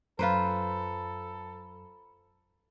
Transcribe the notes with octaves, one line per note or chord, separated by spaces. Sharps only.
F#2 F4 A4 B4 C5 A#5 B5